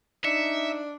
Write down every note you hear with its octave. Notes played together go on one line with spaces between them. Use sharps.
D4 D#4 E5 C#7